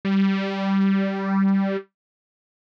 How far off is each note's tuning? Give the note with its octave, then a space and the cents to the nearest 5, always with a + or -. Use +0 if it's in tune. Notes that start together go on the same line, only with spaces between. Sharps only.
G3 -10